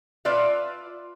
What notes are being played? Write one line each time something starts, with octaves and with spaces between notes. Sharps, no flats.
F4 B4 D5 E5